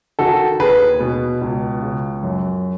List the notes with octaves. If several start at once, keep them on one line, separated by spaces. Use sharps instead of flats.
D#3 F#4 A4
D#2 G#4 B4
B2
C#2
C#3
F#2